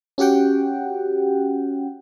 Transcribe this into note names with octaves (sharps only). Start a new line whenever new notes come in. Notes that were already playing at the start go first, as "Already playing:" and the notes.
C#4 F#4 G4 F#5 G5